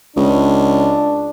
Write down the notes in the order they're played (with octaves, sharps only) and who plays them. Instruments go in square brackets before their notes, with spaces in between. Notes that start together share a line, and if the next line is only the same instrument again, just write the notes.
[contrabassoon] C#2 [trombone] D4